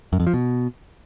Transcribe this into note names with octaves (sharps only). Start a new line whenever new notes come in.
F#2
F2
F3
B2